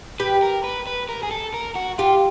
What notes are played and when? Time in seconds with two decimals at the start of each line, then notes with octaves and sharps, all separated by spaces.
0.20 G4 B4
0.42 A#4
0.64 B4
0.87 B4
1.09 A#4
1.23 G#4
1.31 A4
1.54 A#4
1.75 F#4
1.98 F4 G4